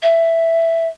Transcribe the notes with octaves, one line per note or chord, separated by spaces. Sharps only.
E5